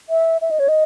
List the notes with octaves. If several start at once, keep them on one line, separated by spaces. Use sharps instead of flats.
E5
E5
D#5
C#5
D#5